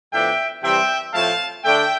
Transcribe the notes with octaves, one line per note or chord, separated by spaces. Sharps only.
A2 F3 B3 D4 E5 G5
C3 E3 G3 C4 E5 G5
A2 F3 A3 C4 E4 F5 A5
D3 A3 D4 E5 G5